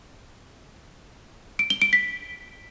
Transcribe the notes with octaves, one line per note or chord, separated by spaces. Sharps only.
D7
G7
D7
B6